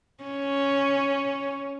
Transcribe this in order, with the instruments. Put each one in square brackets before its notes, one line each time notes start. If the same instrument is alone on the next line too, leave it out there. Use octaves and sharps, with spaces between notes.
[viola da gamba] C#4